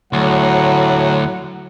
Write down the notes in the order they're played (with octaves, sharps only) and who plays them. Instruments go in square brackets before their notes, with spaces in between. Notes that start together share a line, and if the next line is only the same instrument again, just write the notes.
[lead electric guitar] D2 [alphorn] A2 [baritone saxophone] F#3 [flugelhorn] F#5